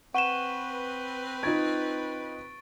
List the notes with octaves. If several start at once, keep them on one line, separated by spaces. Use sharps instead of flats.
C4 B4 F#5 C#6 D#7 E7 G7
D#4 F4 C#6 G#6 A6 D7